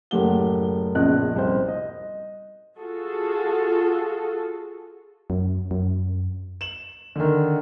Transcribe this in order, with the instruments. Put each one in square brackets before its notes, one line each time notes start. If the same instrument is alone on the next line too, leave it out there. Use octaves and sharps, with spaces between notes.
[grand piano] F#1 A2 G4 F#5 G7
A#1 C#3 B3 D#5 F#6
C2 C5
D#5
[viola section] F4 F#4 G#4 A4
[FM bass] F#2
F#2
[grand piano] E7 F#7
D3 D#3